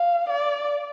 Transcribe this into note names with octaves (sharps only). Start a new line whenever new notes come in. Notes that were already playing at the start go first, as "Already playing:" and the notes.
Already playing: F5
D5